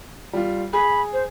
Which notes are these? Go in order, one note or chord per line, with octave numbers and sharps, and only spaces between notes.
G3 F4
G#4 B5
C5